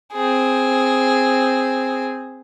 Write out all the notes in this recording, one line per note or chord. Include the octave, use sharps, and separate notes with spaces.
C4 G#4